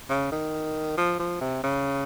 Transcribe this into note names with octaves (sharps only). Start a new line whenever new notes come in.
C#3
D#3
F3
F3
C3
C#3